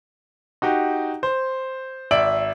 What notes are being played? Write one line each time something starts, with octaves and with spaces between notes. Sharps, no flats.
D#4 F#4 G4
C5
G#1 D5 E5 D7 F#7